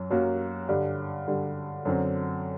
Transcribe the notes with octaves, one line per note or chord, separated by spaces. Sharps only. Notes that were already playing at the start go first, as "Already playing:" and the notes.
Already playing: F#2 F#3
F#2 F#3 A#3 F#4
G2 D3 G3
G2 D3 G3
F#2 D3 F#3 C4